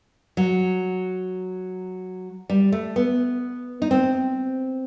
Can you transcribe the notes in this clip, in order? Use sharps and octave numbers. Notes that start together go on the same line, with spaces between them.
F#3
G3
A3
B3
D#4
C4